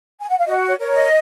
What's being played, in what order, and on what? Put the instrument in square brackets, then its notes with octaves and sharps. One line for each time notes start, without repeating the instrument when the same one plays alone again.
[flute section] G#5
F#5
F5
F#4 D#5
C#5
A#4 C#5
D#5